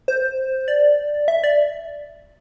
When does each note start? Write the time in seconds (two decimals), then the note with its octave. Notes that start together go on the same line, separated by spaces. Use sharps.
0.08 C5
0.68 D5
1.28 E5
1.44 D5